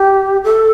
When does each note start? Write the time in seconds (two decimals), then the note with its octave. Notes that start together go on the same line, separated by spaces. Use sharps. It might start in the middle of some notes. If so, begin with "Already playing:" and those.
Already playing: G4
0.44 A4